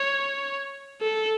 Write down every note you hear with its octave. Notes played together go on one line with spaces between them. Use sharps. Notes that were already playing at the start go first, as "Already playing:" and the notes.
Already playing: C#5
A4